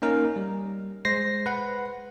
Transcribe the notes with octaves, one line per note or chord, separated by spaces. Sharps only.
A#3 C#4 D#4 A#4
G3
G#3 C5 A#6 C7
B4 F#5